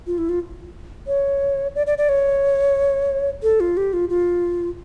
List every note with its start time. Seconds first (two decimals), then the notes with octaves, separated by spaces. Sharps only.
0.07 F4
0.18 E4
0.29 F4
1.07 C#5
1.75 D5
1.87 D5
1.98 D5
2.09 C#5
3.43 A4
3.60 F4
3.77 G4
3.93 F4
4.09 F4